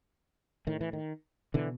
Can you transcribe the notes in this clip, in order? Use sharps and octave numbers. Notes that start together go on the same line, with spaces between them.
A2 D#3
E3
D#3
B2 D3 E3